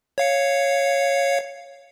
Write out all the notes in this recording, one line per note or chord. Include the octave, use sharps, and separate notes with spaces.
C#5 F5 C#7